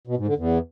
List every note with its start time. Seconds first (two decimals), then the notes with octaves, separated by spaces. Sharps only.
0.07 B2
0.17 G#2
0.27 D3
0.37 E2